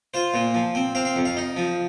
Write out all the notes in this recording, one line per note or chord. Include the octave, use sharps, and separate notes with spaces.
F4 C5
A#2
F3
C4
C4 F5
F5
F2
F5
D#4
F3